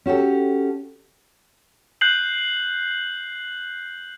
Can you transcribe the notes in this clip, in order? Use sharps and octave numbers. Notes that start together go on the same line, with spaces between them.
C#4 F#4 G4 A4
F#6 G6 C7 F#7